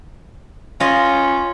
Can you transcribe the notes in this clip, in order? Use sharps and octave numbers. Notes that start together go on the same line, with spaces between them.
C#4 F4 D#5